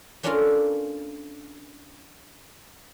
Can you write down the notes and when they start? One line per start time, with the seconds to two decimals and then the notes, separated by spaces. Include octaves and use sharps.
0.23 A#3 C#4 D4 F4 A4 A#4